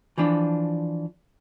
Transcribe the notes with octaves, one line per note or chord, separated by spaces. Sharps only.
E3 F3 D4